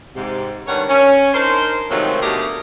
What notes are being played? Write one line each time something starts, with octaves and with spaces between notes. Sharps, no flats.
G#2 C3
G2 D#3 G3 C#4 C#5 F#5
C#4
D4 D#4 A#4 C5
G#2 C3 D#3 F3 F#3 A3
B2 D3 A3 G4 G#4 A#4